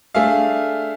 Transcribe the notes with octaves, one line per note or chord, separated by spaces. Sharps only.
A3 D4 G#4 E5 F5